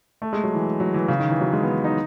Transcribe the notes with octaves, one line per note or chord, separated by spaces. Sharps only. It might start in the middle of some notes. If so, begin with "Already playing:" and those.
A3
G#3
F#3
E3
F#3
E3
C#3
D#3
E3
F#3
G#3
B3
D#4